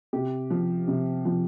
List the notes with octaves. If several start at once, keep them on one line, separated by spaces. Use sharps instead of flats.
C3 G4
F3
C3
F3